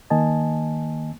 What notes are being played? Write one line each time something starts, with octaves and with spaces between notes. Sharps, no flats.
D#3 A#3 D#5 G#5 A5